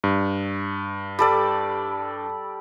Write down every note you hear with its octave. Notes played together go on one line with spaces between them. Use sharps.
G2
G3 A4 D5